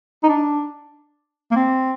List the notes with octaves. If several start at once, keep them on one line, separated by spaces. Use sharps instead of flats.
D#4
D4
A#3
C4